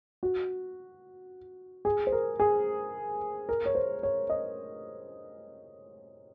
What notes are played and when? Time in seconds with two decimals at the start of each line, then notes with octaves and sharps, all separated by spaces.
0.23 F#4
1.85 G#4
2.07 C5
2.12 A#4
2.40 G#4
3.49 A#4
3.66 C#5
3.75 C5
4.03 C#5
4.30 D#5